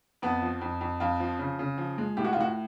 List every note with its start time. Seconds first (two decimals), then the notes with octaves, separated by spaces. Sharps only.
0.22 F2 B3
0.42 F3
0.61 F2
0.81 F2
1.00 F2 F4
1.20 F3
1.39 C#3
1.59 C#3
1.78 F3
1.98 G#3
2.17 A2 G4
2.24 F#4
2.33 F4
2.37 A2 F#4